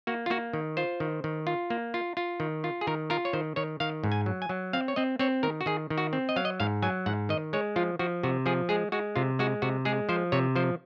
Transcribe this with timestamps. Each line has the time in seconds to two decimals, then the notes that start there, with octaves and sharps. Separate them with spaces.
0.07 A#3 F#4
0.26 F4
0.30 A#3 F#4
0.53 D#3
0.77 F4 C5
1.00 D#3
1.24 D#3
1.47 F4
1.70 A#3
1.94 F4
2.17 F4
2.40 D#3
2.64 F4
2.81 G#4
2.87 D#3 A#4
3.10 F4 A#4
3.25 C#5
3.33 D#3 C5
3.56 D#3 C#5
3.80 D#3 F5
4.04 G#2
4.12 G#5
4.26 F#3
4.42 G#5
4.49 F#3
4.73 C4 F5
4.88 C#5
4.96 C4 D#5
5.19 C4 C#5
5.43 D#3 A#4
5.61 F#4
5.66 D#3 G#4
5.90 D#3
5.98 F#4
6.13 C4
6.29 D#5
6.36 F#3 F5
6.45 D#5
6.60 G#2 F5
6.82 F#3 G#5
7.06 G#2 F#5
7.29 D#3 D#5
7.53 G#3 C#5
7.76 F3 F4
7.99 F3 F#4
8.23 C3 F#4
8.46 F3 G#4
8.69 G#3 G#4
8.92 G#3 F#4
9.16 C3 F4
9.39 G#3 F#4
9.62 C3 F#4
9.85 G#3 G#4
10.09 F3 C5
10.32 C3 C#5
10.56 F3 C5